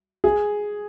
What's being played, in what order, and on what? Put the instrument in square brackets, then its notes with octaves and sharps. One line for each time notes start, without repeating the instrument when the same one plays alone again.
[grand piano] G#4